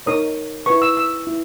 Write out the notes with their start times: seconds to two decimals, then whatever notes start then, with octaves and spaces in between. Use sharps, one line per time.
0.06 D#4 A#4 C#5 D#6
0.66 E4 B4 C#6
0.82 E6
0.97 E6
1.27 E4